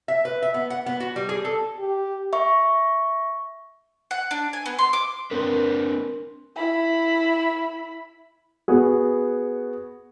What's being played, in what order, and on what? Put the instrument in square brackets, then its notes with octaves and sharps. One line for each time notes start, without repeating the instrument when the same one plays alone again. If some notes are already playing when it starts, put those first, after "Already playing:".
[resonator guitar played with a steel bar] E5
B4
E5
B3
F#5
B3
F#4
G3
G#4
A4
[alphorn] G4
[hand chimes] E5 C#6
[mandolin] F#5
D4
G#5
B3
C6
D6
[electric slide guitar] C4 D4 B4 [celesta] A#4 C6
[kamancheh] E4 B5
[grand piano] B3 F#4 G#4